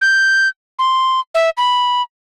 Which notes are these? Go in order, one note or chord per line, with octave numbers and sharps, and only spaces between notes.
G6
C6
E5
B5